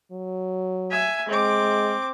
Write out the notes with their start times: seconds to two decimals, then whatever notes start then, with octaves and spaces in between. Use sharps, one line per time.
0.12 F#3
0.91 E5 G#5
1.28 G#3 C4 D6